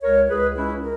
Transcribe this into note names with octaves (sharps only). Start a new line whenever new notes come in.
C#2 A#4 C#5
C#2 G#4 B4
C#2 C#4 E4
A#4